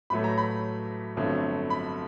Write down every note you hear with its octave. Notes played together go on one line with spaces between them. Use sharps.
A1 A2 F#3 A3 B5
A#5
B5
G1 F2 D3 F#3 A3
B5